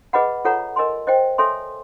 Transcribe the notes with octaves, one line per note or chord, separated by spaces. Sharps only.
G#4 B4 D#5 F#5 B5
F4 A4 C#5 F#5 A#5
A#4 D#5 G#5 C6
C5 D#5 G5
A4 C#5 E5 G#5 C6